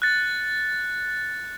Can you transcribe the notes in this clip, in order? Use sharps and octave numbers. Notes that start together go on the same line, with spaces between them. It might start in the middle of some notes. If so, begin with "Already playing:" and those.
F#6 A6 C#7